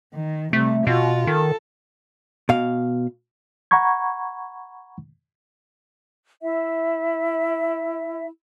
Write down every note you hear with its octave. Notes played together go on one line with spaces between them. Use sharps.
D#3
C3 G3 A3
B2 F4 F#4
D#3 A4
B2 F5
F#5 A#5 B5 C#6 G#6
E4 E5